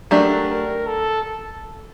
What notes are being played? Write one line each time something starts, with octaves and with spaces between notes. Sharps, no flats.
F#3 A3 D4 G4 A#4
A#4
A4